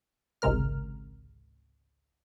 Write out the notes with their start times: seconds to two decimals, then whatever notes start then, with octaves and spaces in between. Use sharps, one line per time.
0.42 G#1 C#2 C3 G#3 A#4 F6